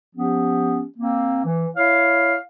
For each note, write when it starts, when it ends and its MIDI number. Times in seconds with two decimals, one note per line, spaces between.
0.15 0.83 53
0.15 0.83 59
0.15 0.83 61
0.15 0.83 67
0.98 1.42 58
0.98 1.42 60
1.44 1.67 52
1.75 2.36 64
1.75 2.36 73
1.75 2.36 77